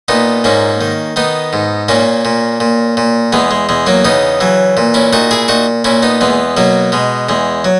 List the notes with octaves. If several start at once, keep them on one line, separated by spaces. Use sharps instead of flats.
A#2 B3 D#4
G#2 A#3 C#4
D#3
D#3 B3 D#4
G#2
A#2 A#3 C#4
A#2
A#2
A#2
E2 G#3 B3
G#3
E2 G#3
F#3 A#3
C#3 B3 D#4
E3 F#3
A#2
C#4 E4
A#2 D#4 F#4
E4 G#4
A#2 D#4 F#4
A#2 C#4 E4
B3 D#4
E2 G#3 B3
B2 F#3 A#3
B2 G#3
E2 G#3
F#3